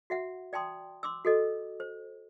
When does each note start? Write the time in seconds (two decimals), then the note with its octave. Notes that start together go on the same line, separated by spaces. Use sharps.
0.10 F#4 E5 F#5
0.53 D5 G5 A5 C6 D#6
1.03 C6 D6 E6
1.25 F#4 A4 D#5
1.80 C5